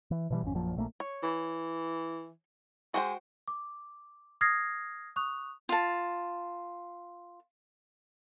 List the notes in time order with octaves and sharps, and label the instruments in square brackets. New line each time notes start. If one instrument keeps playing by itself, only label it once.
[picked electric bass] E3
B2 E3 G3
G#1 F2 C#4
A#1 F#2 A#2 F3
A#1 A3 A#3
[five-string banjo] C#5
[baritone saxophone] E3
[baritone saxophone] G#3 [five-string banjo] F#4 C5 G5
[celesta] D6
D#6 F6 G#6 A#6 C7
C#6 D#6 F#6 F7
[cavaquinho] F4 A5